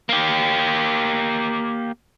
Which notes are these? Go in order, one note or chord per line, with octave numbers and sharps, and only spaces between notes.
A#3 G4